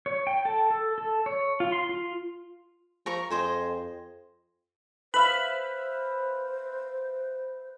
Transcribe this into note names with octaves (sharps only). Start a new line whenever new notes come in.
C#5
G5
A4
A4
A4
C#5
F4
C6
F4
F3 A#4 A#5 C#6
F2 G#4 C5 D#5
B4 C5 E5 F5 B5